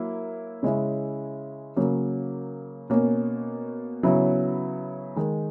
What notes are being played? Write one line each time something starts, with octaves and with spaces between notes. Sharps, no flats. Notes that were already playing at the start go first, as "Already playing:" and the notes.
Already playing: F#3 A#3 E4
C#3 G#3 C#4 E4
C#3 F#3 A#3
B2 A#3 C#4
C#3 F#3 B3 E4
D#3 G#3 D#4